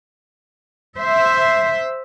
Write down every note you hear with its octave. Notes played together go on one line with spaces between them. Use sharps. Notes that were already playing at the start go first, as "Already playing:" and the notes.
C5 E5